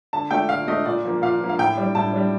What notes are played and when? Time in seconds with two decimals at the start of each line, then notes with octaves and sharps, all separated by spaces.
0.13 D3 A5
0.31 A3 D4 G5
0.49 D3 F5
0.68 A3 D4 D#5
0.85 A#2 D5
1.05 F3 A#3
1.22 A#2 F5
1.40 F3 A#3
1.49 F5
1.59 A2 G5
1.78 G3 D4
1.95 A2 A5
2.13 G3 D4